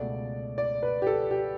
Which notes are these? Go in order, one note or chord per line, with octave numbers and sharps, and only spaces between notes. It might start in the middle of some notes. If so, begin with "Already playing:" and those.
Already playing: C#2 B2 A3 D5
D5
B4
G4
A4
G4